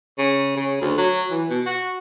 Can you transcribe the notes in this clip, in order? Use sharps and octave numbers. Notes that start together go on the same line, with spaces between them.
C#3
C#3
D2
F#3
E3
B2
F#4